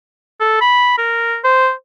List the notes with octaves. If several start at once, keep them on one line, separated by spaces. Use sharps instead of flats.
A4
B5
A#4
C5